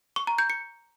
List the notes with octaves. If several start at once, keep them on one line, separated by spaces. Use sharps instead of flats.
C#6
A#5
G6
C#7